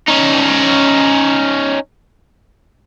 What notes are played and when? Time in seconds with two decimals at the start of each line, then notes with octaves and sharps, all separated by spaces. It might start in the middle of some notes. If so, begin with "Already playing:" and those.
0.08 C#4 D#4